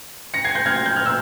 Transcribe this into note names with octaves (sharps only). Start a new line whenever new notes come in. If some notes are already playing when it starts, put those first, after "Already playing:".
A#6 C#7
G#6 C7
G6 A#6
F6 G#6
G#6
G6
F6
E6 G6